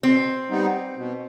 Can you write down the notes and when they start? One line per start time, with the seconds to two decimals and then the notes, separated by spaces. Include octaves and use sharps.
0.03 B2 C4
0.50 G3 B3 D#4
0.96 B2